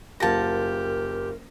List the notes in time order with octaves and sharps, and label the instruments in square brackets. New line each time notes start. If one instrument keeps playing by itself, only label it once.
[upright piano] F#1 F4 A#6 [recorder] G4 [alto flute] A#4 [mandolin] F#5 A5